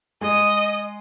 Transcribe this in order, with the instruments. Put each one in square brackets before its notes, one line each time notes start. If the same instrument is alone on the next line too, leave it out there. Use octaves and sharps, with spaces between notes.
[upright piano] G#3 [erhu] D#5